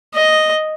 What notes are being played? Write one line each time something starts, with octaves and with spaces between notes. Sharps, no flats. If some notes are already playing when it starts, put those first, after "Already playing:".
D#5